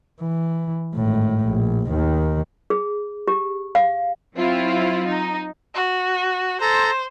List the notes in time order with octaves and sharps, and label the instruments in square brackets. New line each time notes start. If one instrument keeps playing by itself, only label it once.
[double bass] E3
G#1 A2
A#1
D#2 D#3
[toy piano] G#4
G4
F5
[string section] F#3 C4 E4 F4
D#4
[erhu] F#4
[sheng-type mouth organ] A4 A#5 [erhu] C5